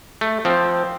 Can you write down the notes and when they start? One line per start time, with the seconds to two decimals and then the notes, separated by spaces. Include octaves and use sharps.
0.21 A3
0.45 F3 C4